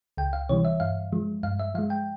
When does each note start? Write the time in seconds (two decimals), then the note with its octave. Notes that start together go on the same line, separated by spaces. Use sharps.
0.17 C#2 G5
0.33 F5
0.49 C3 E3 G3 C#5
0.65 E5
0.80 G2 F5
1.12 F3 G#3
1.43 G2 F5
1.60 E5
1.74 F3 F5
1.78 G#3
1.90 G5